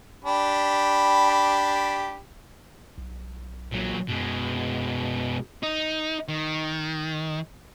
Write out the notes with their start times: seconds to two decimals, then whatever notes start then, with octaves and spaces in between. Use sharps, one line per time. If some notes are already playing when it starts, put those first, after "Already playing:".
0.25 D4 G4 B5
2.98 B1
3.72 A#2 F#3
4.08 F#2 B2 G#3
5.63 D#4
6.28 D#3